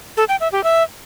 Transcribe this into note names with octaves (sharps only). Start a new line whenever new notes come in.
A4
G5
E5
G4
E5